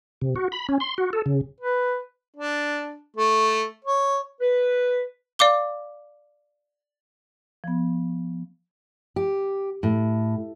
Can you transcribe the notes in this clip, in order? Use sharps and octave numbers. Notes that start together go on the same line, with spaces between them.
C3
F#4
B5
C#4
C6
F#4
A4
C#3
B4
D4
A3
C#5
B4
D5 F5 D6 G7
F3 B3
G4
A2